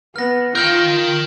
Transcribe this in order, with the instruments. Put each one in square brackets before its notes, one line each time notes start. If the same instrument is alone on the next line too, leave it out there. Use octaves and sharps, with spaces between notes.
[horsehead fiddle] B3 [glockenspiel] F6 A#6
[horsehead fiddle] F4 [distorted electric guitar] A#4 G5 [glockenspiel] F6 G6